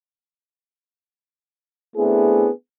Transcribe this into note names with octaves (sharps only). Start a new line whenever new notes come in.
A3 B3 C4 D4 E4 G#4